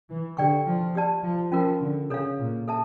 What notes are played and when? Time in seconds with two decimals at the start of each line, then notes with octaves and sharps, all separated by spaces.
0.09 E3
0.37 D3 G4 D5 G5 C#6
0.66 F3
0.95 G4 D5 A5
1.23 F3
1.52 F3 C#4 F4 A#4
1.80 D3
2.10 C#3 A4 C#5 F5
2.39 A#2
2.68 A4 E5 A5